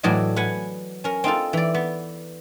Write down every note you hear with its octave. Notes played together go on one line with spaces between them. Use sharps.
A2 E3 F#3 D5 D#5
B4 F#5 G#5
C#4 A#4
C4 D#4 F4 A4
E3 D5
B3